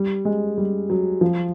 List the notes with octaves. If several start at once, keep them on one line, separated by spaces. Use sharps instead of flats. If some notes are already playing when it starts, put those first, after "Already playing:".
Already playing: G3
G#3
G3
F#3
F3